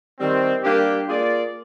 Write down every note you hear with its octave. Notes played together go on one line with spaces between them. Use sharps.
D#3 G3 C4
G3 A#3 D4 G4
A#3 F4 G#4 D5